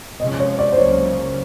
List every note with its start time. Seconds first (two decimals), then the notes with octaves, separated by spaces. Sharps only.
0.19 C3 F3 G#3 C#4 D#5
0.39 C#5
0.59 D5
0.72 C5
0.78 C#2 C#3 F#3 A#3 C#4 C#5